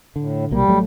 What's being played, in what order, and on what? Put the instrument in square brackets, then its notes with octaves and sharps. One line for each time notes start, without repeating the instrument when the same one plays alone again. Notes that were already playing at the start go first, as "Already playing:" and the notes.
[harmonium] A2 [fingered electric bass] D3
[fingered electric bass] B1 C3 A#3 [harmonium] G3
[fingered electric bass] A1 F#3 A3